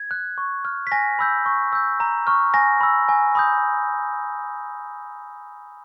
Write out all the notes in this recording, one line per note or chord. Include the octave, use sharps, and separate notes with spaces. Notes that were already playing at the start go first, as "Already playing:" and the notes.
Already playing: G#6
F#6
C#6
F6
B6
G#5 A#6
B5 E6 G6
C#6
E6 G6
A#5
C#6 F6
G#5 A#6
B5 E6
G#5
B5 D#6 G6